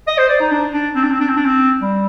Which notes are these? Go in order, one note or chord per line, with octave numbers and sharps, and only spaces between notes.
D#5
C5
D5
D#4
D4
D4
C4
D4
C4
D4
C4
D4
C4
G3